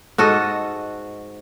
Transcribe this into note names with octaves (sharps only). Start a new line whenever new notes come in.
G#2 F#4 A4 D#5